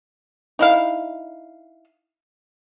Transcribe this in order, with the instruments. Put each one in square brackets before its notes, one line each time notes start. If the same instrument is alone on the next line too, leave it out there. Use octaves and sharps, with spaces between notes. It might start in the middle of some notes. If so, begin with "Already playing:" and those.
[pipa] D#4 E4 F5